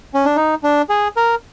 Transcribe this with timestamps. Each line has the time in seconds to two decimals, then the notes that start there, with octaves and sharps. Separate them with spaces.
0.14 C#4
0.25 D4
0.36 D#4
0.63 D4
0.89 G#4
1.16 A#4